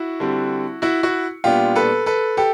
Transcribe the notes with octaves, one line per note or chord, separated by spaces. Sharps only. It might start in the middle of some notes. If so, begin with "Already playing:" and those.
Already playing: E4 F#4
D3 G3 C4
E4 F#4
E4 F#4
A#2 G3 B3 D4 F4 G4
A4 B4
A4 B4
G4 A4